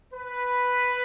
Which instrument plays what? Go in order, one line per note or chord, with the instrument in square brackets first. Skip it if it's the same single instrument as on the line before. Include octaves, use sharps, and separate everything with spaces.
[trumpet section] B4